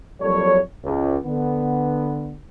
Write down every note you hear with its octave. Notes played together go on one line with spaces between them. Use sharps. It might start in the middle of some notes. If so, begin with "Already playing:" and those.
F2 F#3 G3 A#3 A4 C#5
C#2
D3 B3